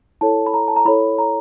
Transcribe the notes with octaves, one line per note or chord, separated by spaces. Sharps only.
E4 A4 C#5 A5
B5
A#5
A5
A#5
E4 A4 C#5 B5
A#5